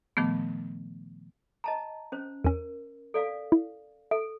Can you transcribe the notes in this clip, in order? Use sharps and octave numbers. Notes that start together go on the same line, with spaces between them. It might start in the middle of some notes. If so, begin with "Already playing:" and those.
A#2 D#3 F3 A3 B3
D#5 A5 A#5
C#4 C5
E2 C#4 A#4
A4 D5 F5
E4
A4 E5